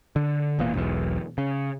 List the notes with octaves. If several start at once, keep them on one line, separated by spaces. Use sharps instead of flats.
D3
E1 E2 A#2 A#3
E1 B1 E2
C#3